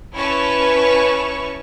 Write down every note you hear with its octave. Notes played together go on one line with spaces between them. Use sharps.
C#4 E4 B4 C#5 A5 C#6